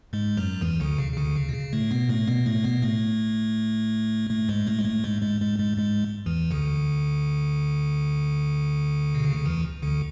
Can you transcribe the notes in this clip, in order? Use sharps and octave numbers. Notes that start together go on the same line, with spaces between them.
G#2 G#3
F#2 F#3
E2 E3
D2 D3
C#3
C#3
D2 D3
C#3
B2
C#3
A2 A3
B2 B3
A2 A3
B2 B3
A2 A3
B2 B3
A2 A3
A2 A3
G#2 G#3
A2 A3
G#3
A2 A3
G#2 G#3
G#2 G#3
G#2 G#3
G#2 G#3
G#2 G#3
E2 E3
D2 D3
B2
C#3
D3
E2 E3
D2 D3